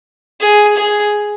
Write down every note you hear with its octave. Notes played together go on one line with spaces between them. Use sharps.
G#4
G#4